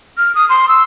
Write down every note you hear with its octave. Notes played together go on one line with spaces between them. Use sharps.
F6
D#6
C6
E6